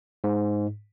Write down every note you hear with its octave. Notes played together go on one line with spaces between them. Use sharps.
G#2